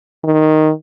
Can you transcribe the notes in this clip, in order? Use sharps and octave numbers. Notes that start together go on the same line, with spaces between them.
D#3